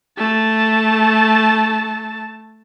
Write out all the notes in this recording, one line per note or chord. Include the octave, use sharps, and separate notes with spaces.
A3 A5